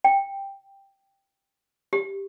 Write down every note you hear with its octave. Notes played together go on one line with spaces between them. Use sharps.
G5
G4